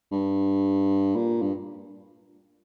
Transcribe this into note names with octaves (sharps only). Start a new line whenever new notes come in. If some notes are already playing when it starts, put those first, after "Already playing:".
G2
A#2
G2